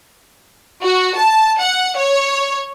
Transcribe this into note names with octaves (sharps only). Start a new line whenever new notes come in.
F#4
A5
F#5
C#5